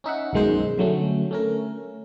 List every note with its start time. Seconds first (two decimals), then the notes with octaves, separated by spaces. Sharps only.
0.04 C#4 D#4 E5 F#5
0.33 B1 F#2 D#3 G#3 D#4 C5
0.78 D3 F#3 A3 C#4
1.31 A3 C#4 A#4